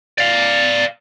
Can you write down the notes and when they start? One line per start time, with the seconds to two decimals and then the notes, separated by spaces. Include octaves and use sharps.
0.18 D5 F5